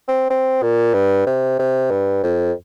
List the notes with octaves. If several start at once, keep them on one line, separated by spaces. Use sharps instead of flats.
C4
C4
A#2
G2
C3
C3
G2
F2